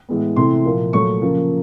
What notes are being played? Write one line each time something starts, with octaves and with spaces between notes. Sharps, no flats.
A2 E3 G#3 B3
C3 E3 A3 C6
A#2 F3 A#3
A#2 F#3 A3 C#6
C#3 F3 A#3